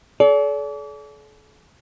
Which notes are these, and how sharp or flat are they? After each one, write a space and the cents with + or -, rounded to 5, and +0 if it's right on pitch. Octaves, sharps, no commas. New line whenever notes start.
A4 -45 D5 -40